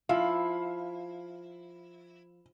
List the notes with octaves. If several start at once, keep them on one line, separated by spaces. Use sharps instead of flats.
F3 E4 F5